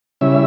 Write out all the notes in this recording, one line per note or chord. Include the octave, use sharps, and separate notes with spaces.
C#3 G3 C#4 E4 E5